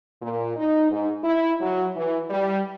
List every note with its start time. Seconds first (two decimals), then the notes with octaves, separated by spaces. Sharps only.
0.22 A#2
0.56 D#4
0.91 G#2
1.24 E4
1.61 F#3
1.96 E3
2.30 G3